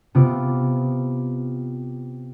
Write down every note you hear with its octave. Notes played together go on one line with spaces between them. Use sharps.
C3 B3 F4 D6